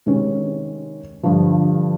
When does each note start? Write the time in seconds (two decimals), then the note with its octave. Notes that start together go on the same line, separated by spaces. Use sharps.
0.06 C3 D#3 G#3 C#4
1.23 G2 D3 F3